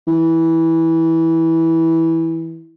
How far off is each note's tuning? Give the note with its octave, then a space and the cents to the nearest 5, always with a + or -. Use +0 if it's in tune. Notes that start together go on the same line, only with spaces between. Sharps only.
E3 -15